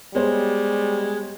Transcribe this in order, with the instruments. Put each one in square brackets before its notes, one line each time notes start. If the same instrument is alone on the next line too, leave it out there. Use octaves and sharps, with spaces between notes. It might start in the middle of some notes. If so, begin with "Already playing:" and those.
[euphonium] G3 [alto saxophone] G#3 [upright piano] B3 C5 C#5